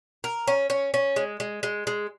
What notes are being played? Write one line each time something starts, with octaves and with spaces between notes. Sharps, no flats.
A#4
C#4
C#4
C#4
G#3
G#3
G#3
G#3